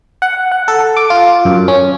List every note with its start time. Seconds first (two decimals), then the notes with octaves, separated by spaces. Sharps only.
0.22 F#5
0.52 F#5
0.68 A4
0.97 D6
1.10 F4
1.45 F#2
1.68 C#4